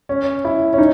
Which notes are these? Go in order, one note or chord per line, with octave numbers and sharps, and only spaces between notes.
C#4
E4
C#4
D#4